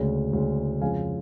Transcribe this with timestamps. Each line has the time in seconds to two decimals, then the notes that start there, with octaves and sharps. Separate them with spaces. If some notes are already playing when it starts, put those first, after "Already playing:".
Already playing: D2 C#3 G#3
0.33 D2 C#3 G#3
0.81 F2 C#3 G#3 F5 G#5